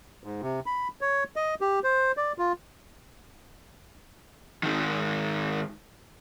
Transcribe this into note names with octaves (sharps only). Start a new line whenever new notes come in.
G#2
C3
B5
C#5
D#5
G4
C5
D5
F4
G#2 D#3